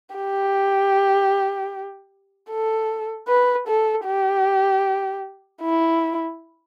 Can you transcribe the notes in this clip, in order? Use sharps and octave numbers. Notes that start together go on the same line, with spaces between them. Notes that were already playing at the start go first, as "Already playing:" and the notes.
G4
A4
B4
A4
G4
E4